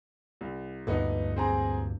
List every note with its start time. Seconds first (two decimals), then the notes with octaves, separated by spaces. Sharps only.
0.41 C2
0.87 D2 G2 A#2 A3 B3 D#4
1.36 C4 G#4 A#5